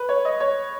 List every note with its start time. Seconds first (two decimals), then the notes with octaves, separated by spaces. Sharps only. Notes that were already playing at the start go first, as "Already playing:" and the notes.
Already playing: B4
0.09 C#5
0.25 D#5
0.40 C#5